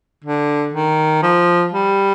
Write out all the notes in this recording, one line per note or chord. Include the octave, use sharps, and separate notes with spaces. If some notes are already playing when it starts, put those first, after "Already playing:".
D3
D#3
F3
G3